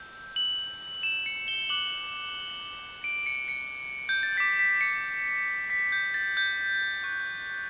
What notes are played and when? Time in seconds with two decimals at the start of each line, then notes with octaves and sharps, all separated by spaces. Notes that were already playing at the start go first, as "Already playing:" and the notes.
Already playing: E6 G6
0.36 F#7
1.03 E7
1.26 C#7
1.48 G7
1.69 D6 F#6 F#7
3.04 D7
3.26 C#7
3.48 C#7
4.09 G6
4.23 A6
4.37 D6 G6 B6
4.59 B6
4.81 C#7
5.70 B6
5.92 G6
6.14 A6
6.37 G6
7.04 C#6 F#6